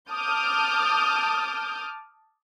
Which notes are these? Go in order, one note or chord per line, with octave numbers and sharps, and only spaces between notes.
A5 D6 D#6 F6 G6